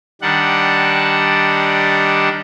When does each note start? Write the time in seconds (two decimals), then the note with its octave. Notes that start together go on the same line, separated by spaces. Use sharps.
0.22 D#3 G3 D4 F#5